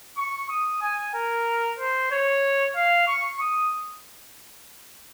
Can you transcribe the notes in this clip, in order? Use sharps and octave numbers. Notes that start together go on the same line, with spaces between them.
C#6
D#6
G#5
A#4
C5
C#5
F5
C#6
D#6